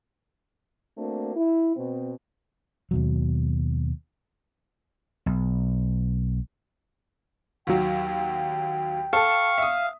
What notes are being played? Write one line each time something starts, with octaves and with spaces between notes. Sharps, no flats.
A3 A#3 C4 D4 F#4
E4
B2 C4
D#2 B2 F#3
B1
D#2 F#3 G5
A4 F5 A5 C#6
E5 D#6